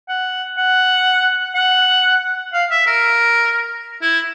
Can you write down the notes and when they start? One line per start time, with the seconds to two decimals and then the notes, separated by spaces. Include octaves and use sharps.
0.09 F#5
0.58 F#5
1.55 F#5
2.53 F5
2.71 E5
2.87 A#4
4.02 E4